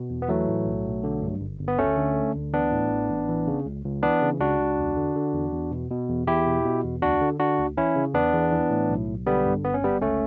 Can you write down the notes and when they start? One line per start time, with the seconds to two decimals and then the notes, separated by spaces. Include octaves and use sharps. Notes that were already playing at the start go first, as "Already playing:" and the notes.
Already playing: B2
0.10 E2
0.22 B3
0.28 E3 F#3 A3
0.47 A2
0.66 B1
0.85 B1
1.04 D3
1.22 G2
1.41 G1
1.60 G1
1.68 B3
1.78 D2 A3 C#4
1.97 D3
2.16 D3
2.35 D2
2.53 E3 B3 D4
2.72 A2
2.90 A1
3.10 A1
3.29 E3
3.47 C#3
3.66 C#2
3.85 C#2
4.03 E3 B3 D4
4.22 C#3
4.40 C#2 D4 F#4
4.59 C#2
4.78 E2
4.97 D3
5.15 D3
5.34 E2
5.52 E2
5.71 B2
5.91 B2
6.09 E2
6.27 E2 E4 G4
6.46 B2
6.65 B2
6.84 E2
7.02 D2 D4 F#4
7.22 D3
7.39 D3 D4 F#4
7.58 D2
7.77 E3 C#4 E4
7.96 C#3
8.14 E2 B3 D4
8.34 E2
8.52 E3
8.71 A2
8.90 B1
9.08 B1
9.26 D3 G3 B3
9.46 G2
9.64 G1 B3
9.74 C#4
9.83 G1 G3 B3
10.01 C#2 A3 C#4